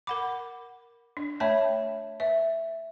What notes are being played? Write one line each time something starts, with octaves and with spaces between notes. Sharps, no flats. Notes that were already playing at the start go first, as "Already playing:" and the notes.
A#4 F#5 B5 D6
D4
A3 C#5 E5 G5 A5 B5
B4 E5